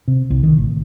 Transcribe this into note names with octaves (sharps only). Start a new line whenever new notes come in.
C3
C2
D#3
A1